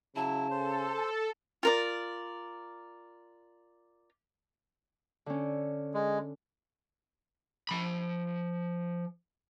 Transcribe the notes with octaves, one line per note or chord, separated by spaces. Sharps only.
C#3 F#3 E4 A5
A4 C5
F4 A#4 D5
D3 C#4
G#3
F3 B5